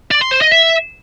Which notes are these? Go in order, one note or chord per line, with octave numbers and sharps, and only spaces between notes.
D5
C6
C5
D#5
E5